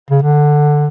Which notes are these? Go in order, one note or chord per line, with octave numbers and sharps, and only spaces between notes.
C#3
D3